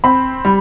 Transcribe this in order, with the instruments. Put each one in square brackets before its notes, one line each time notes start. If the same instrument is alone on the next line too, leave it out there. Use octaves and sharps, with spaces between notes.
[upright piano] C4 B5
G3